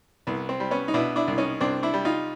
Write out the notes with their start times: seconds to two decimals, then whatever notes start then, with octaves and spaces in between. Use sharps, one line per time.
0.27 C2 B3
0.49 C4
0.60 G3
0.71 B3 C#4
0.88 D#4
0.94 B2 D4 E4
1.16 D4 E4
1.28 C2
1.38 C#4 D#4
1.61 C2 C4 D4
1.83 D4 E4
1.94 G3
2.05 D#4 F4